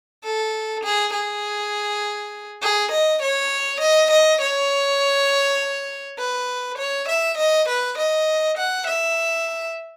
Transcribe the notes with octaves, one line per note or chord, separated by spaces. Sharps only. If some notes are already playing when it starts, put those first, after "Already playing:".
A4
G#4
G#4
G#4
D#5
C#5
D#5
D#5
C#5
B4
C#5
E5
D#5
B4
D#5
F#5
E5